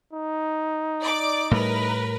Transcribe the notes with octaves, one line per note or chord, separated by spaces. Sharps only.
D#4
D5 D6
A2 G3 A#4 B4